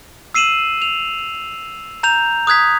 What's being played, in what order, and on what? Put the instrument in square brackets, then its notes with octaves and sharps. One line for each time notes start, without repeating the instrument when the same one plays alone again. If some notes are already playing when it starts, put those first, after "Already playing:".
[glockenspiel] E6 C7 D#7 E7 F#7
F7
A#5 G6 F7
D#6 F#6 G#6 B6